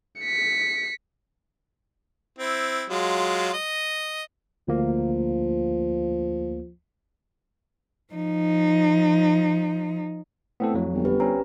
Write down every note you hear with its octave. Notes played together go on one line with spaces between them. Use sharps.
B6 C#7
C4 E4
F#3 G#3 F4
D#5
D2 F3 A#3
F3 D#4
A2 B3 C4 A4
F2 F#3
G1
C4 G4 B4
C4 C#4 A#5